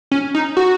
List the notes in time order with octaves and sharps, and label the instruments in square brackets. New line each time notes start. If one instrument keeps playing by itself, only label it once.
[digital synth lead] C#4
D#4
F#4